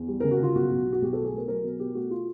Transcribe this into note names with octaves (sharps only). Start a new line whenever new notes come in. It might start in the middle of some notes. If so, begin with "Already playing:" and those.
Already playing: E2
G3
C#3 A#4
F#4
C#3 F4
B1 F#4
B1
B2
F#4
B1 G4
B2 A4
G#4
A3 A#4
F#3 A#4
B2
B2 G4
A3 F#4
F4